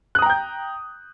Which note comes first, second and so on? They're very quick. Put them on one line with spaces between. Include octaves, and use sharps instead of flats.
F#6 D#6 A#5 G5 G6